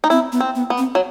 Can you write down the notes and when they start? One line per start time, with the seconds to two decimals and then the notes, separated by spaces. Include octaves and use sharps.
0.04 D#4
0.10 C4 E4
0.32 B3
0.40 C4
0.55 B3
0.70 B3
0.78 C4
0.95 F#3